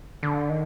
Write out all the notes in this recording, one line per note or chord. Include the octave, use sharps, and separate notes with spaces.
D3
D#3